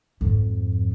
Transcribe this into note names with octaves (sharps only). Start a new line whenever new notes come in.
F2 G#2